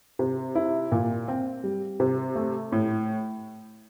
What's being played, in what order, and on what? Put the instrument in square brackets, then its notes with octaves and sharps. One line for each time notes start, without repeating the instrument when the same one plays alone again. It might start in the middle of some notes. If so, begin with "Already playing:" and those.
[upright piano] C3
E4
A#2
C4
G3
C3
A3
A2